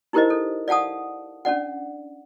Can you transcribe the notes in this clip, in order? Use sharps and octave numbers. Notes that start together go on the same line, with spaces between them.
D#4 E4 G4 A#4 C5 D#5
A4
D5 F5 F#5 A5 D#6
C#4 D4 D5 F#5